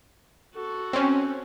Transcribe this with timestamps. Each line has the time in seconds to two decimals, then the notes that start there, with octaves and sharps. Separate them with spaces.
0.54 F#4 A4
0.93 C4 C#4